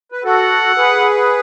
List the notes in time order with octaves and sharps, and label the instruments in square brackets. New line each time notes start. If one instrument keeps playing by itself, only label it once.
[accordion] B4
[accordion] F#4 A4 [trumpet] F#5
[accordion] G#4 B4